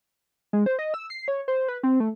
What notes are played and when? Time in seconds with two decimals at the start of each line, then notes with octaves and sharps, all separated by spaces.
0.53 G#3
0.66 C5
0.79 D#5
0.94 E6
1.10 C7
1.28 C#5
1.48 C5
1.68 B4
1.83 C4
2.00 A3